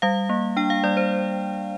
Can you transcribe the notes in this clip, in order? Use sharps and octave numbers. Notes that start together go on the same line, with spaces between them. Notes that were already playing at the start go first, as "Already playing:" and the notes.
G3 F5
A#3
D4 G5
F5
G3 D5
C5